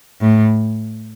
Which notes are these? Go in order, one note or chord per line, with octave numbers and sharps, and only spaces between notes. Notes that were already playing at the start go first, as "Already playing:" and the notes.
A2